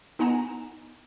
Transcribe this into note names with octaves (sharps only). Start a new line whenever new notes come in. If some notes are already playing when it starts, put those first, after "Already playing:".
B3 D#4 F#5 G#5 A#5 E7